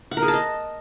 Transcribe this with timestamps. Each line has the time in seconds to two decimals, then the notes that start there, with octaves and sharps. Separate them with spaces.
0.11 F#5
0.17 A#4
0.23 G#4
0.28 A5
0.34 D#5